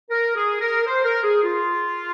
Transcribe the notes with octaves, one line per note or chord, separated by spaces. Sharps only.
A#4
G#4
A#4
C5
A#4
G#4
F4